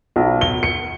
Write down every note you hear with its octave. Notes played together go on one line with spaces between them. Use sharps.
B1
G7
C#7